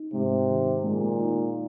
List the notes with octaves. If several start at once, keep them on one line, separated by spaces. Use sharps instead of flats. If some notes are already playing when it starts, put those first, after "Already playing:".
Already playing: D#4
G#2 C3
D#3
A#2 G#3
D#4